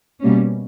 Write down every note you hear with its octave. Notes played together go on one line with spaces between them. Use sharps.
B2 G3 A#3 C#4